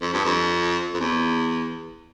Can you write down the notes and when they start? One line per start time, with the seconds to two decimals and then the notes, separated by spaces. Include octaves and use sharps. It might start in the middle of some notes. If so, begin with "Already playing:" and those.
0.02 F2
0.14 G2
0.25 F2
0.94 F2
1.00 E2